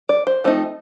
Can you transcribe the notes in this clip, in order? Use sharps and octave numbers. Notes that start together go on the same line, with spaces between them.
D5
C5
F3 A3 C4 D#4